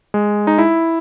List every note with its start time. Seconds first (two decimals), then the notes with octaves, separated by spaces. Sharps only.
0.14 G#3
0.47 D#4
0.58 E4